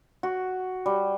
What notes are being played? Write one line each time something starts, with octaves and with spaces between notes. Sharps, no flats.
F#4
G3